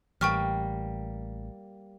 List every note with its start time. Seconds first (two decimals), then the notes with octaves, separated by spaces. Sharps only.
0.21 A1 G3 A#3 G5 C#6 F6